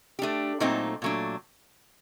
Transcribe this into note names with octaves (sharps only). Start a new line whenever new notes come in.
A3 D4 G4
A#2 F#3 A3 C4 D#4
A#2 F#3 A3 D4